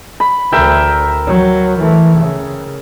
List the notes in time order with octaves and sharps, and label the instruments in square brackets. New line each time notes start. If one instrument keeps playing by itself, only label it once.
[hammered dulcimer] B5
[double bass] D2 [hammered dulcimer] A#4 E5 G5
[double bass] F#3
E3 A3
C#3